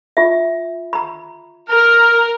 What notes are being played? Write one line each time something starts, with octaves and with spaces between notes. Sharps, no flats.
F4 E5
A#5 B5
A#4 F6